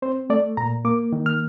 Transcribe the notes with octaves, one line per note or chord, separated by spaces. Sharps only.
C4 C5
A3 D5
A#2 A#5
A#3 D6
D#3
F6